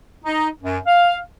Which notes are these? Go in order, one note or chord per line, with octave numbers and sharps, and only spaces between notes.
D#4
F#2
F5